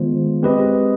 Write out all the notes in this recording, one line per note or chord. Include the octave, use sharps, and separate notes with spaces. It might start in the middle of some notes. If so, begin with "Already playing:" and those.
Already playing: D#3 G#3 B3 F4 C5
G#3 C4 G4 B4 D#5